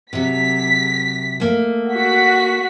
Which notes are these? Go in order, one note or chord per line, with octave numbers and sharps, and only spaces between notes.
C3 F#3 B6
A3 A#3
F#4 B6